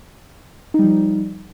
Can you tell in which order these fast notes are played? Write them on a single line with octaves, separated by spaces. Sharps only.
D#4 G3 F3